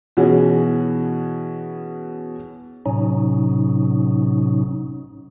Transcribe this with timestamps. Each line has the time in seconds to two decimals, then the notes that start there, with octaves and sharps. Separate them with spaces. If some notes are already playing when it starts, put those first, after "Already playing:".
0.17 B2 E3 C#4 F#4 G#4
2.86 A2 C3 F#3 C#4 D#4